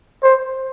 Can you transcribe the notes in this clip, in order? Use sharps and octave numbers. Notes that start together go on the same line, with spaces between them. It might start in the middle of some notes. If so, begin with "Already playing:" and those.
C5